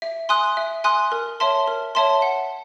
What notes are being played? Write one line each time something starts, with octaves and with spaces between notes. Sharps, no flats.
E5
G#5 C6 D#6 F#6
E5
G#5 C6 D#6 F#6
A#4
C#5 E5 A5 C6
A#4
C#5 E5 A5 C6
F#5